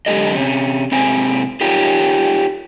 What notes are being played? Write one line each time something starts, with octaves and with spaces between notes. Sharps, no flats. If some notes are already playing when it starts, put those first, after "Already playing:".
F#2 D3 G#3 G4 A4 D#5
C3 C#4
G#2 C3 C4 G#5
D#4 F4 G4 A#4 C#5